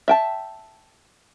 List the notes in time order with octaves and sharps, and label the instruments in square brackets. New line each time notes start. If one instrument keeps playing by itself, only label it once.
[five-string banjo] E5 G5 A5